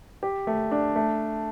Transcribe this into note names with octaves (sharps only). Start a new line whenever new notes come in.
G4
A3
D4
A3